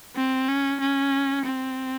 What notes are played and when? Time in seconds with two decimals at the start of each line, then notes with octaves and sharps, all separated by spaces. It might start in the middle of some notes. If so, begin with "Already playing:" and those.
0.16 C4
0.48 C#4
0.80 C#4
1.45 C4